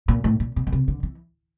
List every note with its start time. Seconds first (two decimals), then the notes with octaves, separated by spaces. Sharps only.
0.08 A#2
0.24 A2
0.40 A#2
0.56 B2
0.67 B2
0.72 C3
0.88 D3
1.03 E3